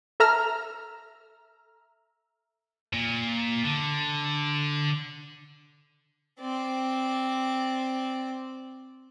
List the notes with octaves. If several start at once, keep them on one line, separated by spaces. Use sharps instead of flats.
A4 E5 A#5 E6 F6
A#2
D3
C4 D5